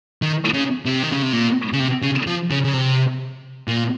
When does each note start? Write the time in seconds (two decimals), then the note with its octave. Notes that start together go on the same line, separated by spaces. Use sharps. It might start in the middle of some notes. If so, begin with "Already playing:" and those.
0.22 D#3
0.54 C#3
0.85 C3
1.03 D#3
1.12 C#3
1.22 C3
1.33 A#2
1.73 C#3
1.80 C3
2.02 C#3
2.27 F3
2.51 C#3
2.64 C#3
2.73 C3
3.68 A#2